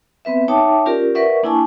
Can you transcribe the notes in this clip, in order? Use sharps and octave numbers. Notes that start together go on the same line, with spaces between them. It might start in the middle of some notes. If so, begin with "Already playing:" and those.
B3 C4 B4 E5
D#4 C#5 E5 G5 A5 D6
C#4 F4 G4 A#4 D5
A#4 B4 D5 E5 F#5 C#6
A#3 D4 E4 G#5 A5 C#6